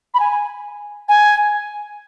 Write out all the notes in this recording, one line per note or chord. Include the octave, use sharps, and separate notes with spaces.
B5
G#5
G#5